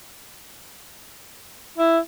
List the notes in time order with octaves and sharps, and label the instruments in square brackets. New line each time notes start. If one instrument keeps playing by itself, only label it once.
[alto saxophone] E4